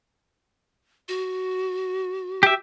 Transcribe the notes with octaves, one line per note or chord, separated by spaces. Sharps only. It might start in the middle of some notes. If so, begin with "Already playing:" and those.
F#4
G4 E5